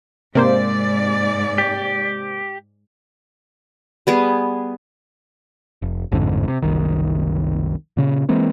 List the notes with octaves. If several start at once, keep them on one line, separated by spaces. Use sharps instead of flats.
G#2 C3 A#3 C5 D5
G4
G3 B3 G#4
F1
A1 F2 G#2 D3
C3
F#1 C2 D#3
A#2 C#3
E3 G#3 A#3 C4